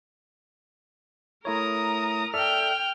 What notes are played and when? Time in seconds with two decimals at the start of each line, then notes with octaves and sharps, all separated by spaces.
1.45 A3 E4 A#4 C#5 A#5 D#6
2.34 A4 D5 E5 G5 F6